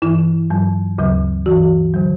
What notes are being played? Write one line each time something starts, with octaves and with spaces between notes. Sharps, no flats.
G2 E3 E4
G2 F#3
D2 C#3 F#3
G2 E3 F#4
D3 F#3